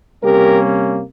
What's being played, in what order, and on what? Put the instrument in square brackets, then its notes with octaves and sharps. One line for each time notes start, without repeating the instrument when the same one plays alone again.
[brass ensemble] C3 G3 A#3 C#4 G4 A#4